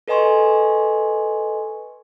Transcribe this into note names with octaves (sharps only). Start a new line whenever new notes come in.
A4 B4 D#5 G#5 C6 C#6